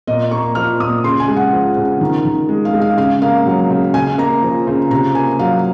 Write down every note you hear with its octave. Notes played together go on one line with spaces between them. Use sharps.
A#2 D#5
A#3 C#6
F3 F6
A#2 D#6
C#3 C6
G#5
G#3
F#5
F3
C#3
D#3
D#3
G#3
F5
G#3
F5
C#3 F5
A#3 F5
F#3
C#3
C#3 G#5
A#3 A#5
F3
C#3
C3 A#5
A#3 G#5
F#3 F5